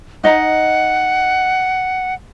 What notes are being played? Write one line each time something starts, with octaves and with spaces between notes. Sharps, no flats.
D#4 D#5 F#5 A#5